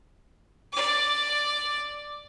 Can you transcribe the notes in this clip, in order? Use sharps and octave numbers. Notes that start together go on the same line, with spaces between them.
D5 D6